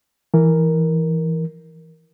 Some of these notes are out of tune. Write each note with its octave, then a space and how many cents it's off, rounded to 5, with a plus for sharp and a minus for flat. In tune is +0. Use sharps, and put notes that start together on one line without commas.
E3 +0 A#4 +0